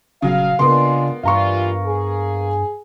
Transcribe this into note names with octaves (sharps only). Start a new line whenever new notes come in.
D#1 C#3 F#3 F5
C#3 G#3 A#3 B3 D4 F4 C6
G2 E3 G3 F4 F5 A#5 C#6
G#4